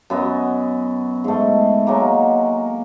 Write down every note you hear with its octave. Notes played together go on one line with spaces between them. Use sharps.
F#2 B3 D#5
G#2 A3
F#3 G#3 A#3